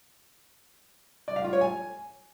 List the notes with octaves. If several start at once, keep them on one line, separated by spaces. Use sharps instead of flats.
D5
F5
F4
C#5
G#5